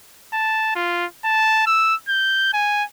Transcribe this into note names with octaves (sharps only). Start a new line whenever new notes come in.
A5
F4
A5
E6
G6
G#5